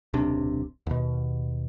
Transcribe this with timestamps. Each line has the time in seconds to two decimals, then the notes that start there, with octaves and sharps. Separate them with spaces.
0.14 D1 B1 C3 D4
0.86 D#2 B2